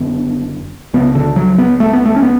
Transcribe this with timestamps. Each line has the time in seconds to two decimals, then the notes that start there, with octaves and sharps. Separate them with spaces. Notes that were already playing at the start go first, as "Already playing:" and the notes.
Already playing: F#1 F#2 D3 B3
0.93 C#2 C#3 B3
1.15 D3
1.36 F#3
1.58 B3
1.80 A3
1.93 B3
2.05 A3
2.16 C#4
2.23 B3